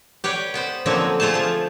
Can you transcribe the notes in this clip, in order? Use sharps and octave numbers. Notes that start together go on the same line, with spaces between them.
G4 B4 C#5 D5
B3 B4 C5
D3 F3 F#3 A#3 C4 C#4
A3 F4 G#4 C5 A5
F3 A5